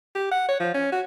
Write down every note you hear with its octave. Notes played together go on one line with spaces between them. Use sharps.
G4
F#5
C#5
F3
C#4
F#4